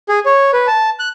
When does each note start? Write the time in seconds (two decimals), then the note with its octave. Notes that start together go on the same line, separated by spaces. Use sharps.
0.09 G#4
0.26 C#5
0.53 B4
0.67 A5
0.99 F#6